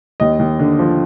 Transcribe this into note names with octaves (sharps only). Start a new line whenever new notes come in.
D#2 D#5
D#2
D3
F3